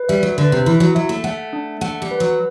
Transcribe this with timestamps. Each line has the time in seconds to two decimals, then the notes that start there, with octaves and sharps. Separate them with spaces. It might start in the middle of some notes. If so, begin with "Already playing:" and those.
Already playing: B4
0.09 G3 E5
0.23 F#3
0.37 D3 B4
0.52 C3
0.66 E3 E4
0.80 F#3
0.95 F#3 E5
1.09 A3
1.24 A3 F#5
1.53 D4
1.81 A3 F#5
2.02 G3
2.11 B4
2.20 F#3